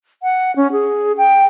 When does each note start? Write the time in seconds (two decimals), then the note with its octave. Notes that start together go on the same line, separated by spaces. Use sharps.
0.23 F#5
0.56 C#4
0.72 G#4
1.17 G5